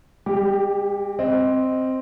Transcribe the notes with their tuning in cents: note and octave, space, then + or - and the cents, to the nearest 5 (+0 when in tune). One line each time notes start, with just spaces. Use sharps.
G#3 -45 G4 +0
C4 +0 D#5 +0